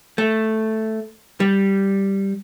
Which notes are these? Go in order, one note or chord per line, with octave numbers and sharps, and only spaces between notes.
A3
G3